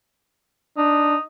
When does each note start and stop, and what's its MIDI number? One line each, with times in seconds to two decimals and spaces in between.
0.77 1.16 62
0.77 1.20 63